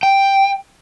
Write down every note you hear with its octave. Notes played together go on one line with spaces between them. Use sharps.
G5